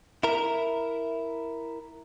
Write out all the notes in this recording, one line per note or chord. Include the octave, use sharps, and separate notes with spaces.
E4 A#4